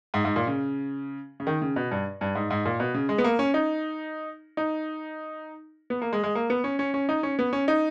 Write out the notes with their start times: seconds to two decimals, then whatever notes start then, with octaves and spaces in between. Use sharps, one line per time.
0.14 G#2
0.25 G#2
0.36 A#2
0.47 C#3
1.40 C#3
1.47 D#3
1.62 C#3
1.76 B2
1.91 G2
2.21 G2
2.35 G#2
2.50 G#2
2.65 A#2
2.80 B2
2.94 C#3
3.09 G#3
3.18 B3
3.24 A#3
3.39 C#4
3.54 D#4
4.57 D#4
5.90 B3
6.02 A#3
6.13 G#3
6.24 G#3
6.35 A#3
6.50 B3
6.64 C#4
6.79 C#4
6.94 C#4
7.09 D#4
7.23 C#4
7.39 B3
7.53 C#4
7.68 D#4